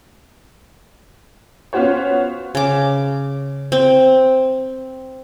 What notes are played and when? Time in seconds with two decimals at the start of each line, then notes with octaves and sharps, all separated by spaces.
1.73 B3 C#4 F4 F#4 C5 C#5
2.55 C#3 D6
3.72 C4